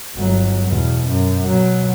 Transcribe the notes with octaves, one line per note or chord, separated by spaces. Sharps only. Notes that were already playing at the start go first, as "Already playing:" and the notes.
G1 F#3
E2 B2
F#2
B2 F#3